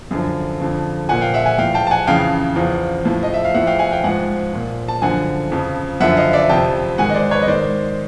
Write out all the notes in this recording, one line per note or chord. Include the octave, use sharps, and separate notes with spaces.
F#2 D3 F3
F2 D3 F3
A#2 F3 F#5 G#5
F5 G5
E5 F#5
F#5 G#5
A2 F3 F5 G5
G5 A5
A5
F#5 G#5
F2 C#3 E3 F5 G5
E2 C#3 F3
A2 F3
D#5
E5
F5
A2 F3 E5 F#5
F5 G5
F#5 G#5
F5 G5
G#2 F3 F#5 G#5
A#2 F3
A5
F#2 D3 F3 F#5 G#5
F2 C#3 F3
F#2 D3 F3 E5 F#5
D#5 F5
D5 E5
F2 C3 F3 G5 A5
G#2 D#3 F#5 G#5
D#5
C5 D5
B4 C#5
D#5
G#2 D#3 C5 D5